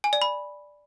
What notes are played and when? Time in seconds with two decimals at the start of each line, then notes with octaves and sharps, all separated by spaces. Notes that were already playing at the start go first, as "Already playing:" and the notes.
0.04 G#5
0.13 D5
0.22 B5